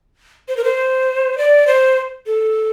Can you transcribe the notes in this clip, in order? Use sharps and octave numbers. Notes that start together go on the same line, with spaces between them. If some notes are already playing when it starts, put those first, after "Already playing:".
C5
A#4
C5
D5
C5
A4